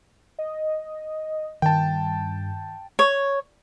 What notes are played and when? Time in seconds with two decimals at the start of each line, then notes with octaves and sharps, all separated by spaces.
0.39 D#5
1.62 G2 D#3 G5 A5
2.99 C#5